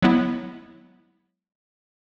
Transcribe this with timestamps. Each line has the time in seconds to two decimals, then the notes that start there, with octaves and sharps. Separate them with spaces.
0.02 F#3 G#3 B3 E4